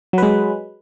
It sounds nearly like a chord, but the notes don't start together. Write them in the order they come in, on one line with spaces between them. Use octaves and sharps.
F#3 B4 G#3